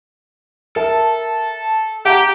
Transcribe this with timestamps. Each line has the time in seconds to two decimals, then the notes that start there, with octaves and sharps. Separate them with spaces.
0.76 A4 A#4 E5 A5
2.05 G4 F#5 A#5